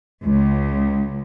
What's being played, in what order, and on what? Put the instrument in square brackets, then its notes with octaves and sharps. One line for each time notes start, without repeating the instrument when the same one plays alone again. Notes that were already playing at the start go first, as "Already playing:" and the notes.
[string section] C#2